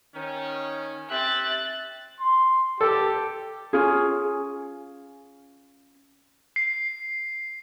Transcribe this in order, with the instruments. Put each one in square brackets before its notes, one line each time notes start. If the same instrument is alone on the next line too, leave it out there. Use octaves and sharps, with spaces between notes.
[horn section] D#3 C#4
[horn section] C4 G4 E5 [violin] F#6 A6
[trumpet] C6
[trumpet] G4 [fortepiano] A4
[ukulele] C#4 F4 G#4
[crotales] C7